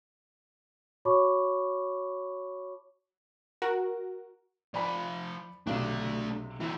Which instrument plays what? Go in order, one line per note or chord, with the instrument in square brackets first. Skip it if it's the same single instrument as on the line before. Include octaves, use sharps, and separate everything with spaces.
[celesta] F#4 C#5 A5 B5 C#6 D6
[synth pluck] F#4 A#4
[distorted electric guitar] F3 G#5 [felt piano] D5 B5
[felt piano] B1 C3 [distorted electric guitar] A3 D4
[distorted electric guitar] E3 C4 [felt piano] E4